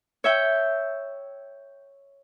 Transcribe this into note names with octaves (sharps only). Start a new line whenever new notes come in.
C#5 E5 G5